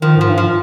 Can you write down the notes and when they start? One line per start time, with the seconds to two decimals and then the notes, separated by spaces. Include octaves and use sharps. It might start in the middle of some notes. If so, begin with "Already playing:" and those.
0.02 D#3 F3
0.16 G#2 F3
0.29 G2
0.38 F3